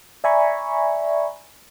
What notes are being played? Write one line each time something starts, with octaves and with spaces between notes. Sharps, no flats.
D5 E5 G#5 A#5 B5 C#6